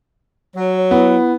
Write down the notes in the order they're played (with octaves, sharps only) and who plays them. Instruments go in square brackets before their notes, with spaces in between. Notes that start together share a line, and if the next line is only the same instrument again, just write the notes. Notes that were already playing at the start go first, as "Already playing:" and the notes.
[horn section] F#3 [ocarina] C#5
[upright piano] B3 [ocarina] E4